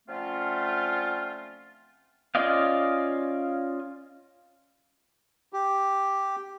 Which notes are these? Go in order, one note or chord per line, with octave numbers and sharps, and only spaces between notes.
D3 F3 A3 C4 C#4 F4
C#4 F4 D5 D#5 F5
G4